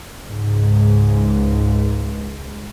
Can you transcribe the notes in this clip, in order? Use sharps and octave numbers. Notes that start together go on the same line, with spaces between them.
C#2 G#2